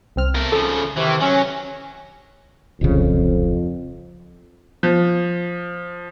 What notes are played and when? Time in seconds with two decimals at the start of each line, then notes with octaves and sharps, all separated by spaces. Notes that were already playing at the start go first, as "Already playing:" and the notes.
0.16 C2 C4 F6
0.35 A3 A#4
0.52 C#3 F3 A4
0.97 C3 D#3 E3
1.21 F#3 C#4
2.81 D1 C2 F2 C#3
4.83 F3